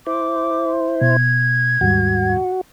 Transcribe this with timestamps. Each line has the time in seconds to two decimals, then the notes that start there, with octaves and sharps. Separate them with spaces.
0.07 E4 C5 D6
1.01 B2 G#6
1.81 D#2 G#2 G3 F#4